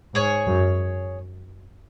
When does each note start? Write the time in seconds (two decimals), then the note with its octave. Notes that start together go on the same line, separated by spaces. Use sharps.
0.14 G#2 G#4 C#5 G#5
0.47 F#2